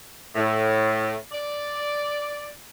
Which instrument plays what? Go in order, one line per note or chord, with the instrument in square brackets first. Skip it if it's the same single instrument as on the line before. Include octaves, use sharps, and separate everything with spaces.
[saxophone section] A2
D5